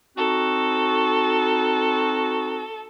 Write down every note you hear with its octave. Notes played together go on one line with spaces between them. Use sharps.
C4 D#4 F#4 A4